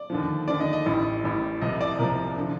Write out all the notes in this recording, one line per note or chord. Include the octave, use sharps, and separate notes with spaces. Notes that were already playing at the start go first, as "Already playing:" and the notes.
Already playing: D5
D#2 D3 F3
D#2 D3 F3 D5
D#5
D#5
A1 A2 G3
A1 A2 G3
C2 C3 F3 D#5
D5
C2 C3 F3 A#4
D3 F3